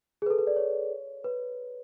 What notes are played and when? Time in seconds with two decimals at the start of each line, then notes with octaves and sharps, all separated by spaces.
0.22 G#4
0.26 B4
0.30 A4
0.38 B4
0.47 D5
0.56 C#5
1.24 B4